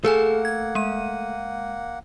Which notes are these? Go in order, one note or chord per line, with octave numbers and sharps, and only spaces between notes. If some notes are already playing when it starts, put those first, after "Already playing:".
A3 A#3 G#4 A4 F#5 G#5
G#6
G#3 D#7